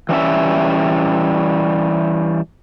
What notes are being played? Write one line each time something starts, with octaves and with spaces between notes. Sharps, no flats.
E3 G3 C#4 E5